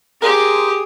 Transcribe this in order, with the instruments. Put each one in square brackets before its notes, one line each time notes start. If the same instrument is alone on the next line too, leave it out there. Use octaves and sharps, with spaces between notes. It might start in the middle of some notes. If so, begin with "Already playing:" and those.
[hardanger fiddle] G4 [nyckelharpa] G#4 [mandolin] A#4 C5